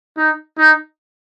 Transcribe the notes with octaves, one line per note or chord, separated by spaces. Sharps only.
D#4
D#4